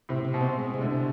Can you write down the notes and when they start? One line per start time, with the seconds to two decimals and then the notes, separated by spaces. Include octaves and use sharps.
0.09 A2 C3
0.25 C3
0.34 B2
0.41 C4
0.58 G#3
0.74 C3
0.81 D3
0.90 C3